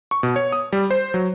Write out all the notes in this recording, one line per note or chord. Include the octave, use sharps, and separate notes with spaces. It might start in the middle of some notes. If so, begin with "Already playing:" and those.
C#6
B2
C#5
D#6
G3
C5
F#3